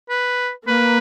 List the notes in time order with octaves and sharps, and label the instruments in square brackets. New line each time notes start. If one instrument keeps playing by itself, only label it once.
[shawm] B4
[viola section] A#3 [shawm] B4